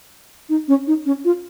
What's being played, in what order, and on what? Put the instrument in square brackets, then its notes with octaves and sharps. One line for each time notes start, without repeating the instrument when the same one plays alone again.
[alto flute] D#4
C#4
D#4
C#4
F4